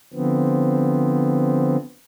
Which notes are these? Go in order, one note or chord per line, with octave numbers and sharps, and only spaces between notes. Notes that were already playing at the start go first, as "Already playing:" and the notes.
D3 F3 B3 C4